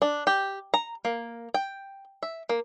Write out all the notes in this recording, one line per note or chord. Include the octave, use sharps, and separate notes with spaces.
D4
G4
A#5
A#3
G5
E5
A#3